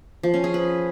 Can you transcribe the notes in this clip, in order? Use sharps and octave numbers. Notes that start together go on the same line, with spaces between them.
F3
C#4
G#4
B4